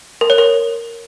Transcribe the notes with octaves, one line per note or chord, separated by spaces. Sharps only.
A#4
C#5
A#4